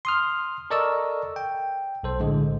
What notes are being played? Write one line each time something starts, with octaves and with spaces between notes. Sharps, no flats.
C6 D#6 F6
A4 A#4 D5 D#5 C#6 E6
G5
B1 A4 C5
A2 D3 G#3